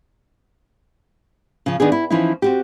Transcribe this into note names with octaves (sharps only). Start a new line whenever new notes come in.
C#3 F3
D#3 B3 D4 G#4
E4
E3 F3 C#4 D#4 E4
C4 F#4 G4